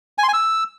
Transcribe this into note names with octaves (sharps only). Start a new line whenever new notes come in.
G#5
C6
G#5
E6